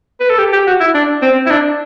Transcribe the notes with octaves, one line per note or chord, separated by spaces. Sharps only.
B4
A4
G4
G4
F#4
E4
D4
C4
E4
D4